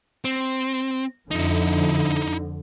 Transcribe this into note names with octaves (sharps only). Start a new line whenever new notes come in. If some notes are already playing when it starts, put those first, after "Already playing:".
C4
F2 D3 F3 D#4 E4